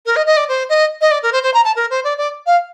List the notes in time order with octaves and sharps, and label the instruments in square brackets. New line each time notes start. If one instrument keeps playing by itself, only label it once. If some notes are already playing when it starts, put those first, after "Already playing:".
[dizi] A#4
D#5
D#5
D5
C5
D#5
D#5
D5
A#4
C5
C5
A#5
A5
A#4
C5
D5
D5
F5